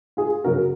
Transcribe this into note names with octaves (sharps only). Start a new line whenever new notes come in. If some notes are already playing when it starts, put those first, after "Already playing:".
F4 G#4
F#2 C#3 F#3 F#4 A#4